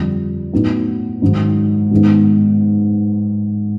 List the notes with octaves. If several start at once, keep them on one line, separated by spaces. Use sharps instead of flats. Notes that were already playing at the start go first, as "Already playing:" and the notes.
Already playing: F2 D3 G3
A2 F#3 B3 D#4
G#2 D#3 F#3
G#2 D#3 G#3 B3